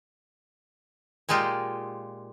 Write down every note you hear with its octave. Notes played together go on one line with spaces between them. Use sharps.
A#2 G#3 D#4 F4 G4